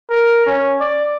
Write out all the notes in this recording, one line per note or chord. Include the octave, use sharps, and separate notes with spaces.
A#4
C#4
D5